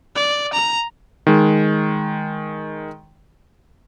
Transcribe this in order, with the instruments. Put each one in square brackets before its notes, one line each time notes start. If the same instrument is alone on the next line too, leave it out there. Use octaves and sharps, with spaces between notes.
[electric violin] D5
A#5
[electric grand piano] D#3 G#3